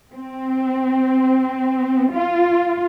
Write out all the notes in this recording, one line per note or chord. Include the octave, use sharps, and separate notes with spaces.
C4
F4